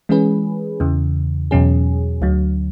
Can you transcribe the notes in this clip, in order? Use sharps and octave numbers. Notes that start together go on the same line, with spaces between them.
E3 G#3 C#4 G#4 B4
E2 C#3 E3
E2 B2 F#3 C#4 G#4
D2 D3 F#3